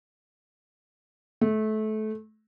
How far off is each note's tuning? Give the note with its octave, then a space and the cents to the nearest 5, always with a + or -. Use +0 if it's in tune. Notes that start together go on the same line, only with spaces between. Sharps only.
A3 -25